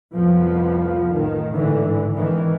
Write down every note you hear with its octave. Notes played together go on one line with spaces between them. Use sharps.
C2 F2 F3 B3
A1 D#3
G#2 D3 E3
G#1 D#3 E3